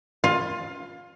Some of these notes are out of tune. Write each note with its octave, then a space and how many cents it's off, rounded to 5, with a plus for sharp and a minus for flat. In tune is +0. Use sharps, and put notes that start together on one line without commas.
F4 +20